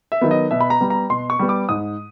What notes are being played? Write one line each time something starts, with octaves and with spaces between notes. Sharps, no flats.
E5
D#3 F#3 B3
D#5
B2 E5
B5
A#5
G3 B3
A#5
B2 C6
C#6
G3 B3
D6
G#2 D#6